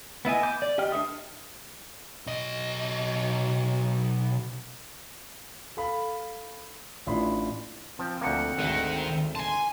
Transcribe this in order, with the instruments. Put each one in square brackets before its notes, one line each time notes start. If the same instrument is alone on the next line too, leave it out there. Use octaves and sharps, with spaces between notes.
[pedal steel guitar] B3 E4 D#5 G#5
D6 G6
D5
G4 D#5 G5 F6
D4 A4 E5 D#6
[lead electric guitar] B1 D#5
[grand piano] A4 F5 B5
A1 D4 E4 F4 B5 C6
[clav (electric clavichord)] F3 [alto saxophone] C4
[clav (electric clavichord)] D2 F3 A#3 [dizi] F#5
[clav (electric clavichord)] G#1 D2 [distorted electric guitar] D#3
[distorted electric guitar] G#5 A5 [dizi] C6